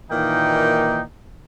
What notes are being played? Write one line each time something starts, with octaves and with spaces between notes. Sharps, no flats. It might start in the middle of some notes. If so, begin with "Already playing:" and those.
A#2 D#3 E3 A#3 D#4 G5